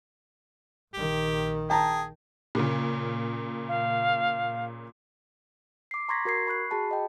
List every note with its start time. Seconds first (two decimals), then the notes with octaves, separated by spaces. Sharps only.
0.94 A#1 D#3 G4
1.70 G#4 G5 A5 A#5
2.55 A#2 C#3
3.69 F5
5.91 D6 C7
6.09 A#5 C6 C#6 G#6 A#6 B6
6.25 F#4 A#4 G#6 C7
6.47 B5 C#6 F#6 C7
6.70 F#4 G#4 A5 B5
6.91 D#5 G5